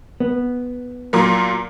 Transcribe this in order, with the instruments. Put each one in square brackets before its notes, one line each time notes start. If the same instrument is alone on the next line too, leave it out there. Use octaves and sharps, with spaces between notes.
[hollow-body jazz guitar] B3
[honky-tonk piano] A#2 F#3 A#3